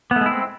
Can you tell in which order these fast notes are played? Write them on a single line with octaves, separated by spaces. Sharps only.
B3 A3 G#3 E4 C4